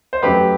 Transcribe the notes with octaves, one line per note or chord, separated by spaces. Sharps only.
C5
F#2 F#3 A3 G4 B4